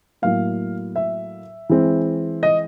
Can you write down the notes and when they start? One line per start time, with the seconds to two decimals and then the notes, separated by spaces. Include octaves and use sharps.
0.22 A2 F#3 A#3 F5
0.96 E5
1.69 E3 G#3 C4
2.43 D#5